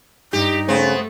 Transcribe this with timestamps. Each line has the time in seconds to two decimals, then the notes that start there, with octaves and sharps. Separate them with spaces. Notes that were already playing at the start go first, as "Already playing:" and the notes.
0.33 G2 D#4 G4
0.68 C#3 A3 B3 C4